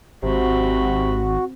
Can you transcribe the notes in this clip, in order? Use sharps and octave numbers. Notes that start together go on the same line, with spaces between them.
G#1 C3 C4 F#4 B5